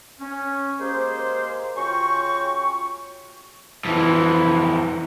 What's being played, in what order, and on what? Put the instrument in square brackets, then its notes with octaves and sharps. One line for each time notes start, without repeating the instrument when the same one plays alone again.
[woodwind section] C#4
G#3 A#3 G4 G#4 C5
C#3 C#4 F4 F#4 G5 C#6
[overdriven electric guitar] F2 E3